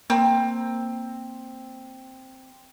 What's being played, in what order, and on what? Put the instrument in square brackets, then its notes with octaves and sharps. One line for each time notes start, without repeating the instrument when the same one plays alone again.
[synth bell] A#3 [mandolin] C4